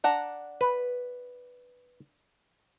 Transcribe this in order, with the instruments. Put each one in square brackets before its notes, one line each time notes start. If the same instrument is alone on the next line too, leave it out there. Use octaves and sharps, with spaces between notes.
[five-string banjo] D4 F#5 A#5
[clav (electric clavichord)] B4